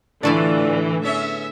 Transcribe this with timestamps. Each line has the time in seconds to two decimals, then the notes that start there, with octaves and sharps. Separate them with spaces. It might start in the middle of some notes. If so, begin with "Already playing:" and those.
0.23 A2 D3 E3 A3 E4 F4 D5
1.03 B3 C#4 G#4 E5